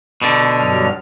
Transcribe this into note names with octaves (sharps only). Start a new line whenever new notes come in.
B2 D3
G2 F#3 F6